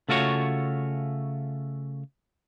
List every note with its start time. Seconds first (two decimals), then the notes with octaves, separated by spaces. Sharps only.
0.09 C#3 A3 F4 F#4 A#4 C#5